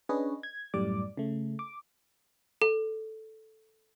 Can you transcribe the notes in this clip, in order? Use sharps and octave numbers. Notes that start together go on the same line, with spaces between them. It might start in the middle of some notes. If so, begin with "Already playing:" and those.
C#4 D4 G#4 B4 C#5 D#5
G#6
F#2 A2 G3 D5 D6
C#3 A3
D6
A4